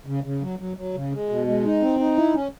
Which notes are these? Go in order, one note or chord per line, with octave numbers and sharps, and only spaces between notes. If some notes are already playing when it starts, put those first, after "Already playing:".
C#3
C#3
F#3
F#3
F#3
C#3
G#3
B2
G#3
D#4
C4
D#4
E4
C#4